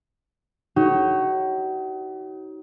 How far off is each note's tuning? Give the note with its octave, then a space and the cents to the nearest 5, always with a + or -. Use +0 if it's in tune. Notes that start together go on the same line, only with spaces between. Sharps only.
D#4 +25 F#4 +40 C#5 +0